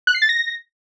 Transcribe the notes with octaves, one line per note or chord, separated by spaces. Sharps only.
F#6
C7
A6
A#6